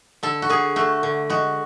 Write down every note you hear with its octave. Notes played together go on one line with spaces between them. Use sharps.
D3 A4
F#4
D3 G#4
A3 F#4
D3
G#3 F#4